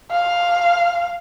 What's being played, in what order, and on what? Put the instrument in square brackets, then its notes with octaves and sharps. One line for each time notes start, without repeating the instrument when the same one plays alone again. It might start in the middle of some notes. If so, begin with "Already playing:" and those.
[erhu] F5